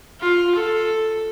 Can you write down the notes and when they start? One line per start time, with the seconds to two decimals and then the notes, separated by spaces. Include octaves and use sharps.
0.20 F4
0.55 A4